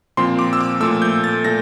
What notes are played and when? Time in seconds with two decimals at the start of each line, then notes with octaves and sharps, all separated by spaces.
0.17 A#2 F3 C4 C6
0.39 D6
0.53 E6
0.61 D6
0.80 A#2 F3 A3 E6
1.02 G6
1.24 A6
1.45 A#2 A3 A#6